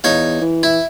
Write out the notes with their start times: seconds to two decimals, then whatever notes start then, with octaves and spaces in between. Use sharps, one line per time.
0.04 E2 D#4 C#5 F5
0.41 E3
0.63 E4